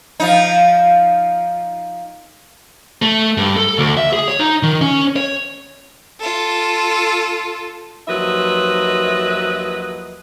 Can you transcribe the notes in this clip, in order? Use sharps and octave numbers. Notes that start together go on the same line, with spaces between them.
F3 D#4
A3
G2
A4
D2
E5
G#4
C#5
D#4
D#3
C#4
C#5
F4 A4
D#2 F3 F#3 B4 D#5 E5